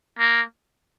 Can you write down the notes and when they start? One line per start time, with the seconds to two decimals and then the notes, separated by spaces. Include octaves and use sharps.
0.19 A#3